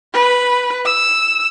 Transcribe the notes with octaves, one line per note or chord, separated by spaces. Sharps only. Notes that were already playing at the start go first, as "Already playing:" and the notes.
B4
E6